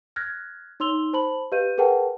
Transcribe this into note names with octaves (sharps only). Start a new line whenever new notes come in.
F6 F#6 G#6 A#6
D#4 C#5 C6 E6 F7 G7
C5 A5 B5 F#7
G4 B4 D#5 F5 G6 D#7
G#4 A#4 B4 F#5 G5 A5